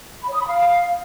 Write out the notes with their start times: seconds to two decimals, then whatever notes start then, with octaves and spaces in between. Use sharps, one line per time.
0.21 B5
0.27 C#5
0.34 D#6
0.40 B5
0.46 F5